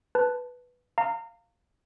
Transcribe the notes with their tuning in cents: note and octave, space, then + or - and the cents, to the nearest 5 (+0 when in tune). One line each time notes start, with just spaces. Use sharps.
B4 +0 A5 +0
F5 +0 A#5 -30